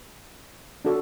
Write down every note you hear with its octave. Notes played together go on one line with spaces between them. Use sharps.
D4 F#4 A4